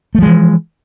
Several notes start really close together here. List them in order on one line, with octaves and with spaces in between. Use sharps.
A3 F3 G#3 E3